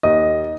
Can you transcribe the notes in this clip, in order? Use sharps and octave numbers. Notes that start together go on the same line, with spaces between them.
D#2 D#5